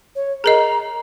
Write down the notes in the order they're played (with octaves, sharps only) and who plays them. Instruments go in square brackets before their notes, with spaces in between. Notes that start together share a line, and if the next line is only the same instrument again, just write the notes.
[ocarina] C#5
[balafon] G#4 A#4 D#5 [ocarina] A#5